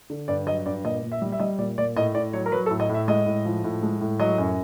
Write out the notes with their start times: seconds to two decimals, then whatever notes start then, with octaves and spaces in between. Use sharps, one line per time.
0.10 D3
0.28 G2 D5
0.47 F#3 D#5
0.66 G2 D5
0.84 A#2 D#5
1.03 A#2
1.12 E5
1.22 G3
1.32 E5
1.40 G3 D#5
1.58 A#2 D5
1.78 A#2 D5
1.96 A2 D#5
2.14 A2 D5
2.33 F#3 C#5
2.46 A#4
2.52 F#3 B4
2.66 A4
2.70 A2
2.80 D#5
2.89 A2 E5
3.08 G#3 D#5
3.26 A2
3.46 F3
3.64 A2
3.83 G#3
4.01 A2
4.20 F#3 D#5
4.38 F#2